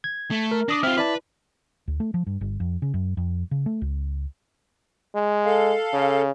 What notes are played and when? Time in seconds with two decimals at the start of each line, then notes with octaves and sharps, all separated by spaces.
0.04 G#6
0.31 A3
0.51 A#4
0.69 D4 D6 D#6 A#6
0.83 C4 E4 F4 F6
0.97 E4 B4 D5 A5
1.88 D2
2.00 A3
2.14 F3
2.27 G2
2.41 G1
2.60 F2
2.82 C#3
2.94 F#2
3.17 F2
3.51 C#3
3.66 A3
3.82 C#2
5.15 G#3
5.46 A4 F5
5.93 C#3